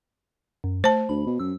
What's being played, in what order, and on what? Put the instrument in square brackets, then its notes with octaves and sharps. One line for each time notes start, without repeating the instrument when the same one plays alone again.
[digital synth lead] F#2
[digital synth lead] A3 [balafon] C5 A5
[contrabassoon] D2 [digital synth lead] B5
[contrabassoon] B2
[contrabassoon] F#2 [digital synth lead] E6